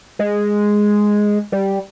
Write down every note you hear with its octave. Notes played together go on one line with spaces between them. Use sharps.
G#3
G3